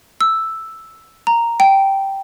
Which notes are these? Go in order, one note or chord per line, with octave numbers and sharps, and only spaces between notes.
E6
A#5
G5